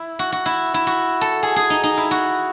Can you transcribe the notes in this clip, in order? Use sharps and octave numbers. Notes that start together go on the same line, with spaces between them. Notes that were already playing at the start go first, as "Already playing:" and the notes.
Already playing: E4
F#4
F#4
E4
E4
F#4
A4
G#4
G#4
D#4
D#4
E4
F#4